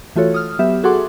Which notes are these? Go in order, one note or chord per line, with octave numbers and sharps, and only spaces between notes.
E3 A3 F4 F#4 A4 C#5
D#6 F6
F#3 B3 G4 E5
F#4 G#4 A4 F#5 C6 D6